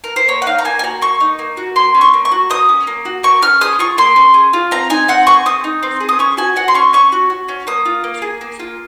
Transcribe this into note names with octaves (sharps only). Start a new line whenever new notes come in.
A#4
C5
A#3 C#5
F#5
D#4 F5
A#5
A#3 G#5
G#5
F#4 A#5
A#3 C#6
D#4
A#3
F#4
A#3 C6
C#4
C#6
A#3
C#6
F#4
A#3 D#6
C#4
A#3
F#4
A#3 C#6
C#4 F6
G#4 D#6
F4 C#6
A#3 C6
C#4
G#4
F4
C4 A#5
D#4 G#5
C4 F#5
G#4 C#6
C4 D#6
D#4
C4
G#4
D#6
C#4 C#6
F#4 G#5
F#4 F#5
C6
C#4 C#6
C#4 C#6
F#4
F#4
C#4
A#3 D#6
F4
A#3
G#4
A#3
F4